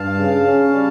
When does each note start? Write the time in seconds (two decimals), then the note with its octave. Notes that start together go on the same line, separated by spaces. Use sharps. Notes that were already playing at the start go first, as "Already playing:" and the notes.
Already playing: G2 F5 A5
0.17 C#3
0.45 C#4
0.73 G3